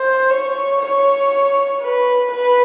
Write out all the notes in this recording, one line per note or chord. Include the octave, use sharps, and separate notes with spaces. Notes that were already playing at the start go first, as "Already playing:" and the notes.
Already playing: C5
C#5
C#5
B4
B4